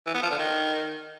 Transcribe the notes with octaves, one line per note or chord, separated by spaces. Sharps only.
E3
B3
F3
D3
D#3